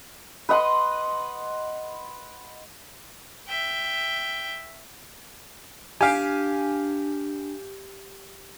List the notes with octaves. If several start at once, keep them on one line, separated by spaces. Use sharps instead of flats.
B4 D#5 F#5 C6
E5 G5
D4 G4 F5 G#5